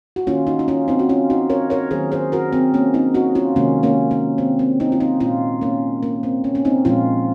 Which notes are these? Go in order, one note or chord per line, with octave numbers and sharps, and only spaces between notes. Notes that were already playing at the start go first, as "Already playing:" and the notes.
F#4
D#3 A#3 C#4 F4
D#4 F#4
D#4
C#4 F4
C4 D#4
F#4
C#4 F4
D#4 F#4
A#4 C#5
A#4 C#5
D#3 F#3 A#3 G#4 C5
G#4 C5
F#4 A#4
C4
A#3 C#4
C4 D#4
D#4 F#4
C#4 F4
C3 D#3 G#3 A#3 C#4
A#3 C#4
A#3
C4
C4
C4 D#4
F4
C4 D#4
A#2 G#3 C#4 F4
A#3 C#4
A#3
C4
A#3 C#4
C#4
C4 D#4
A#2 F3 G#3 C#4 F4